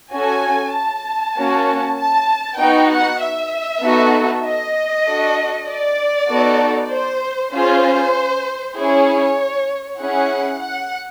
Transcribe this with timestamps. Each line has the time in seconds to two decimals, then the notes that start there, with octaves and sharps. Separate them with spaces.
0.12 C#4 F#4 A4 G#5
0.74 A5
1.36 A#3 C#4 F#4
1.97 A5
2.59 B3 D#4 F#4 G5
2.90 F#5
3.21 E5
3.83 B3 D#4 F#4 A4
4.44 D#5
5.06 D4 F#4 A4
5.67 D5
6.29 B3 D#4 F#4 A4
6.91 C5
7.53 C#4 F4 G#4 C5
8.76 C#4 E4 G#4 C#5
10.00 C#4 E4 G#4 F#5
10.61 F#5